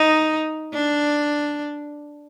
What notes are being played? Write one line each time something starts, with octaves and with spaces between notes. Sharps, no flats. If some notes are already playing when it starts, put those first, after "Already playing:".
Already playing: D#4
D4